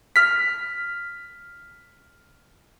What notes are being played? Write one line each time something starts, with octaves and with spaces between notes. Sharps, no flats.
F6 B6